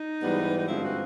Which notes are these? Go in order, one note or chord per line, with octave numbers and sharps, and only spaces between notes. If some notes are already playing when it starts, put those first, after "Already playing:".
Already playing: D#4
G#2 E3 G3 B3
D#4
G2 D3 F3 G#3 C4 E4
F#4